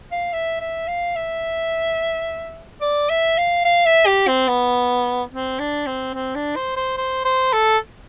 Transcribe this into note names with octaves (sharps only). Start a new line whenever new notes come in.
F5
E5
E5
F5
E5
D5
E5
F5
F5
E5
G4
C4
B3
C4
D4
C4
C4
D4
C5
C5
C5
C5
A4